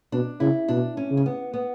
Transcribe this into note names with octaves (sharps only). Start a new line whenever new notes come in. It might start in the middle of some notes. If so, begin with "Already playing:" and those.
B2 D4
C#3 E4
B2 D4
C#4
C#3
C#4
B3
B3